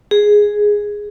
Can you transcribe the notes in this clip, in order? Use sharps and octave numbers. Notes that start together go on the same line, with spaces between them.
G#4